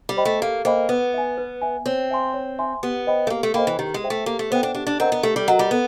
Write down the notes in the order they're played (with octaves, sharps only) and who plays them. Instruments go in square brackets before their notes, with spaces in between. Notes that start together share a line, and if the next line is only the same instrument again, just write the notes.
[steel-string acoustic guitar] G3
[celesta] C5 D#5 G5 B5
[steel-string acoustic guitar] A3
[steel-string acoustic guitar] A#3 [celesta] G4
[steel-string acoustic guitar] A#3 [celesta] C5 D#5 G5 B5
[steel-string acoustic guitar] B3 [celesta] B4
[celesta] E5 G#5
B4
E5 G#5
[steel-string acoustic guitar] C4 [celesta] C#5
[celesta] E5 G#5 C6
C#5
E5 G#5 C6
[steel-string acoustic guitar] B3 [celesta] G4
[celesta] C5 D#5 G5 B5
[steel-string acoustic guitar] A3
[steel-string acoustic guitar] A#3 [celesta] G4
[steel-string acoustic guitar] A3
[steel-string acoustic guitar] A#3 [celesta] C5 D#5 G5 B5
[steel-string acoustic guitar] E3
[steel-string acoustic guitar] D#3 [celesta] G4
[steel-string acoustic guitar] G#3
[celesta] C5 E5 G5
[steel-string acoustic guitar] A3
[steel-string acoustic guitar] A#3 [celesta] G4
[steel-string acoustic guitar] A3
[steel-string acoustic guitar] B3 [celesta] C5 E5 G5
[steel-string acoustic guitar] D4
[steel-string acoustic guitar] D4 [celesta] G4
[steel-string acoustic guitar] D4
[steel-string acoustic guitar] C4 [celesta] A#4 D#5 F#5 A#5
[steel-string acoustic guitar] B3
[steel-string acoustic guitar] A3 [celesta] G4
[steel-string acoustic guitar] G3
[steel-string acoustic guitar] F#3 [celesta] A#4 D#5 F#5 A#5
[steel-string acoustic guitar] G3
[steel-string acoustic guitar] B3 [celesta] A4